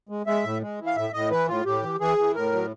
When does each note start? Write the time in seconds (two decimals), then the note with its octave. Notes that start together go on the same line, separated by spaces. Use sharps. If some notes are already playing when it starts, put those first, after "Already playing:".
0.09 G#3
0.26 G#3 E5
0.44 A2
0.61 G#3
0.79 E3
0.87 F5
0.96 A2 E5
1.14 A2 D#5
1.31 E3 B4
1.48 A2 F4
1.65 A2 G4
1.83 E3
2.00 E3 G#4
2.18 E3
2.35 A2 A#4
2.53 F#3